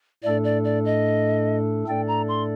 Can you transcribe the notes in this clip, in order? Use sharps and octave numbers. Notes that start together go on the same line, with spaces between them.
A2 A3 D4 A4 D5
D5
D5
D#5
A2 A3 D4 A4 D5 G5
A#5
C6